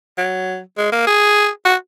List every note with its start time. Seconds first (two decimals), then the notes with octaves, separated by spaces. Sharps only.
0.18 F#3
0.77 G#3
0.92 A#3
1.07 G#4
1.65 F#4